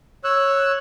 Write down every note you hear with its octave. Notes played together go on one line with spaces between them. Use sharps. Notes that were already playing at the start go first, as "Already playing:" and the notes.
C#5 E6 F#6